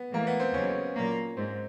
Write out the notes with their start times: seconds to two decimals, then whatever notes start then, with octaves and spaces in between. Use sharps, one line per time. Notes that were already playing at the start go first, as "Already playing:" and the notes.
Already playing: B3
0.11 A2 E3 G#3 A#3
0.27 B3
0.40 C4
0.53 D#2 C#3 F#3 C#4
0.95 A#2 F#3 A#3
1.37 G#2 C4